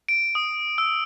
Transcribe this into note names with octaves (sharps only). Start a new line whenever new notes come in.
D7
D#6
E6